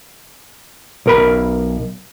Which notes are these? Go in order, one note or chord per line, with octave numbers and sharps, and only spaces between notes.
B1 A#4 B5